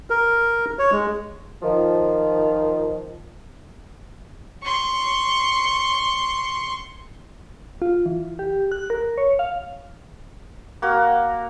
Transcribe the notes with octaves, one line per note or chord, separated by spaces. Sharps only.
A#4
C#5
G#3
D#3 F3
C6 C#6
F4
E3
G4
F#6
A#4
C#5
F5
A#3 F#4 A#4